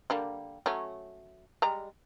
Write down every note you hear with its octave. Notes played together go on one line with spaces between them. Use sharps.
D3 G3 A#3
F#3 A3 C#4
G3 G#3 A#5